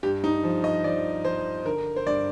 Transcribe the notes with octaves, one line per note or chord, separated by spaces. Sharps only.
G2 G4
D#4
F3
D#5
F3 D5
F3 C5
D3 A#4
C5
G2 D5